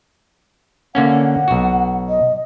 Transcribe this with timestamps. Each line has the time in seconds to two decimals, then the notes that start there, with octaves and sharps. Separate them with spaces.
0.95 D3 A#3 C#4 F#5
1.09 F#5
1.48 B1 F#4
2.09 D#5